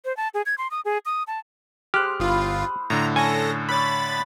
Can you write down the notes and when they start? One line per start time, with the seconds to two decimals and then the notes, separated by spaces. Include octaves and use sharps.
0.05 C5
0.17 A5
0.34 G#4
0.46 G#6
0.58 C6
0.71 D#6
0.85 G#4
1.06 D#6
1.27 A5
1.94 G#3 G4 C5 F6 F#6
2.20 G1 E4 F4 G#4 D#6
2.90 A2 D3 A#5
3.16 C#4 A4 G#5 A#6
3.69 B4 C#5 D5 B5 A6